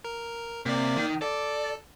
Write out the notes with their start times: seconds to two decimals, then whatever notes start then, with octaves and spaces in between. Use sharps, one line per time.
0.05 A#4
0.66 C3 A#3 D5
0.97 D#3
1.22 A4 D5